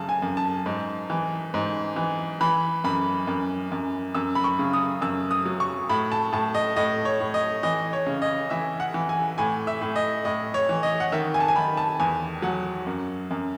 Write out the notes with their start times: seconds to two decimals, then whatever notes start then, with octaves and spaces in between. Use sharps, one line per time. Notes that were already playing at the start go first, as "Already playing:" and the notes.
Already playing: F#2 C#3 A5
0.09 G#5
0.22 F#2
0.37 A5
0.66 G#2
1.10 E3
1.54 G#2
1.96 E3
2.41 E3 B5
2.84 F#2 B5
3.27 F#2
3.72 F#2
4.14 F#2 E6
4.35 B5
4.44 C#6
4.59 C#3
4.73 D#6
5.01 F#2 E6
5.31 D#6
5.45 F#3
5.60 C#6
5.89 A2 B5
6.12 A5
6.32 A2 A5
6.55 D#5
6.76 A2 D#5
7.05 C#5
7.20 A2
7.34 D#5
7.63 E3 D#5
7.93 C#5
8.07 C#3
8.22 D#5
8.50 E3 E5
8.80 F#5
8.94 E3
9.09 G#5
9.38 A2 G#5
9.67 E5
9.81 A2
9.96 D#5
10.25 A2 D#5
10.54 C#5
10.69 E3
10.83 D#5
11.00 F#5
11.12 D#3 E5
11.34 G#5
11.40 A5
11.48 G#5
11.56 D#3 B5
11.77 A5
12.00 E2 G#5
12.42 F#3 F#5
12.87 F#2
13.31 F#2